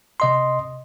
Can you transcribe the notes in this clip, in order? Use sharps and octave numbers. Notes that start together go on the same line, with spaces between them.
C3 D#5 C6